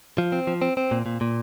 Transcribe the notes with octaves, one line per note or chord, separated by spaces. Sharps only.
F3
C4
F3
C4
C4
A#2
A#2
A#2